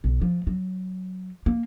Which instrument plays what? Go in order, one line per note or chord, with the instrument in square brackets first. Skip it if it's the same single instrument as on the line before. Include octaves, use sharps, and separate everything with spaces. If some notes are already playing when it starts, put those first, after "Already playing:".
[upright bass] B1
F3
F#3
A#3